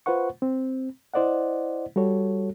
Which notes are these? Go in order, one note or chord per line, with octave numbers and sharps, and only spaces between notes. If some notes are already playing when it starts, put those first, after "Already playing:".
F4 B4 C5 F#5 C#6
C4
E4 C5 D5 D#5 F#5
G3 F#4 A4 C#5